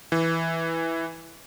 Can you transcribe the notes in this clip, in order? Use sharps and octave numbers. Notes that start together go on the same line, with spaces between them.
E3